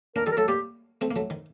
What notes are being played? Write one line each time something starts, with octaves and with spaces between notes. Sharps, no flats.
A#3 D4 A#4
D#3 G3 A4
A#4
F#3 A3 A4
G3 A#3 G4
A3 C4
A#3
F#3 A3
D#3